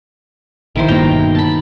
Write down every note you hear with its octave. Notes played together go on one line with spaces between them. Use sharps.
A#1 D#3 E4 C5
G1 B2 A#3 D#4 G5 A#5
A5 B5